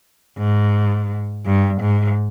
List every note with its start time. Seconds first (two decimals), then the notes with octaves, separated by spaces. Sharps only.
0.38 G#2
1.45 G2
1.81 G#2